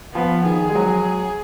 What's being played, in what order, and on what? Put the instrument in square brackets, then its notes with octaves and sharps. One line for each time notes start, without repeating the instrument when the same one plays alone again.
[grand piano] F3 [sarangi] B3
[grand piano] D#3 [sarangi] G#4
[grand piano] G#3
F#3